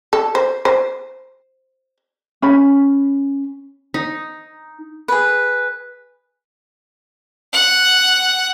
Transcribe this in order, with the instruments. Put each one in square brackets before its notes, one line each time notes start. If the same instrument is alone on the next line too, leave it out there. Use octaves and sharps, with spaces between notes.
[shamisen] A4
C5
C5
[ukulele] C#4 B5
[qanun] D#4
[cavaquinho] G#4 B4
[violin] F#5